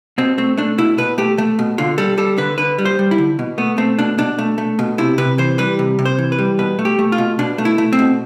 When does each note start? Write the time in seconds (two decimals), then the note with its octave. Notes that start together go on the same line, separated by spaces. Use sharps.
0.18 B2 C4
0.38 A3 C4
0.57 A3 D4
0.78 B2 E4
0.98 B2 B4
1.18 A3 G4
1.38 A3
1.59 B2
1.78 D3 F4
1.98 G3 A4
2.18 G3 A4
2.38 D3 B4
2.58 D3 B4
2.78 G3
2.85 C5
2.99 G3
3.11 E4
3.18 D3
3.39 B2
3.58 A3 B3
3.78 A3 C4
3.99 B2 D4
4.18 B2 D4
4.38 A3
4.58 A3
4.79 B2
4.98 C3 E4
5.18 C3 B4
5.38 E3 C5
5.58 G3 B4
5.79 C3
5.99 C3
6.05 C5
6.18 E3
6.32 B4
6.39 G3
6.59 B2 B4
6.79 A3
6.85 G4
6.99 A3
7.12 F4
7.18 B2
7.39 B2 D4
7.58 A3
7.65 E4
7.78 A3
7.93 C4
7.99 B2